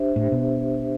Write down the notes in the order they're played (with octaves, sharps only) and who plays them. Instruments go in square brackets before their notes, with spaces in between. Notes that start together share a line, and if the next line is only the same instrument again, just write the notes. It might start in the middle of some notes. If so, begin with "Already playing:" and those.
Already playing: [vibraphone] D4 G4 C5 E5
[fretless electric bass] A2
B2